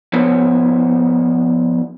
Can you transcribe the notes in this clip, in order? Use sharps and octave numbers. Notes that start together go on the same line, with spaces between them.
F3 B3 D#4 C#5